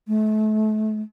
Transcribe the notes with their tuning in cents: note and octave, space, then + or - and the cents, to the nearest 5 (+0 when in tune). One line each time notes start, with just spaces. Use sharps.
A3 -35